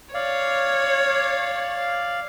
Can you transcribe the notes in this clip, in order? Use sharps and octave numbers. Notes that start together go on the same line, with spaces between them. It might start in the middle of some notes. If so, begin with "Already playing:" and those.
C#5 D5 F5